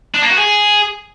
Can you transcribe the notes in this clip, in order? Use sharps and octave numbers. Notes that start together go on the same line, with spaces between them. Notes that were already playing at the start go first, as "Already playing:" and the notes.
D4
A#3
F#4
G#4